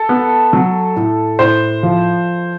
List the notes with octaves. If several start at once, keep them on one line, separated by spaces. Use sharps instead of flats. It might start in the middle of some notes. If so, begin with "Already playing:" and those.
Already playing: A4
B3
F#3
A2
A2 C5
F3